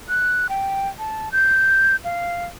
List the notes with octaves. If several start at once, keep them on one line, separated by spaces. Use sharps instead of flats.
F#6
G5
A5
G6
F5